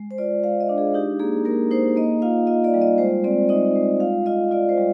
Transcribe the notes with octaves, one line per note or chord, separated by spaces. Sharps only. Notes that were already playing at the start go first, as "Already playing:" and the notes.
Already playing: G#3
C5
F4 D5
G#3 F5
D#5
D4
G#4
D#4 G4
A#3 G#4
A#3 A#4
D#4 C5
A#3 D#5
F4 F5
F4 D#5
D5
G3
D#5
G#3 C5
C4 D5
D#4 D#5
G#3
F4 F5
F4 D#5
F4 D5
C5
G3